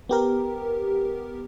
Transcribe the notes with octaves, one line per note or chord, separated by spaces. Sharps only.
B3 G4 A#4